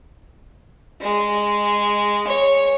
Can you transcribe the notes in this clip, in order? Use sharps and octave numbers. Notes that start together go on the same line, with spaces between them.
G#3
C#5